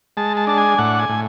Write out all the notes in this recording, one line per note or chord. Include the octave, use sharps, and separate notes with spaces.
G#3 A5
A5
D4 A5
G#5
A2 F#5
G#5
A2